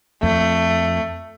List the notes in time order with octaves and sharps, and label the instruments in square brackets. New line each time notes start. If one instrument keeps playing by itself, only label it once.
[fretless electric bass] F2 [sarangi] A3